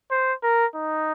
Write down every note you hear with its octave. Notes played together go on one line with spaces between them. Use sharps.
C5
A#4
D#4